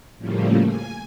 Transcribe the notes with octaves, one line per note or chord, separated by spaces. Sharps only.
A2 C#3 F3 G3 A3 A#3
G#5